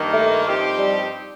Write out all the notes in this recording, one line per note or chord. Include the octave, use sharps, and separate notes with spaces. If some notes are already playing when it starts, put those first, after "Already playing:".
Already playing: G2 D#3 A#3
A3
G2 F3 C4 D#4 G4
G3